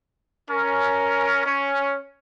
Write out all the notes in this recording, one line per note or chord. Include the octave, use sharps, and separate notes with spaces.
C#4 A#4
C#4 C#5